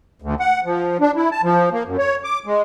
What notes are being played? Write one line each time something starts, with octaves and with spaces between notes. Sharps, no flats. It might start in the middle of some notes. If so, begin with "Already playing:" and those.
D2
F#5
F3
D4
E4
A5
F3
A#3
F#2
C#5
D6
G#3